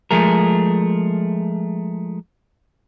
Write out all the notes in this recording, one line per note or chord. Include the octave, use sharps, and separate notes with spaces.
F3 G#3 A3 G#4 A#4